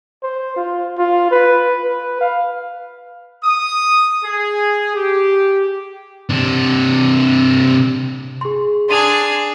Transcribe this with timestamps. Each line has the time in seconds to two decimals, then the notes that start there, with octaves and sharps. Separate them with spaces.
0.23 C5
0.56 F4
0.98 F4
1.31 B4
1.83 B4
2.21 F5
3.44 D#6
4.24 G#4
4.95 G4
6.30 C3 D4
8.41 G#4 C6
8.89 D4 G#4 C6 D#7 F7